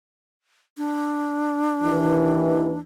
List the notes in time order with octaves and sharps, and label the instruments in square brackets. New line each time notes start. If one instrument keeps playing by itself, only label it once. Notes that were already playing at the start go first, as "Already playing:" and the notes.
[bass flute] D4
[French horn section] D#2 E3